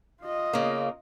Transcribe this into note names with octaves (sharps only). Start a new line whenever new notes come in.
F4 D#5
C#3 A#3